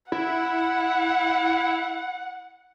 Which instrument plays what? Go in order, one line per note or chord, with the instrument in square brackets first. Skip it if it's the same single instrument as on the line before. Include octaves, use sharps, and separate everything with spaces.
[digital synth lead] E4 [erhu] F#5